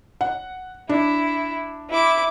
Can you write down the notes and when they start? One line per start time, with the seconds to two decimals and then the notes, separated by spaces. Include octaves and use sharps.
0.21 F#5
0.89 D4 E4
1.90 E4 D6